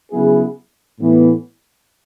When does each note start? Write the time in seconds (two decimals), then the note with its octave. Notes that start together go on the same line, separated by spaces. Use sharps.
0.11 C#3 F#3 B3 E4 G#4
1.00 A2 E3 B3